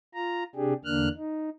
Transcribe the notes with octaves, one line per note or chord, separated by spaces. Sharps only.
F4 A#5
C3 D4 G4 G#4
E2 D3 A#3 D4 F6 F#6
D#4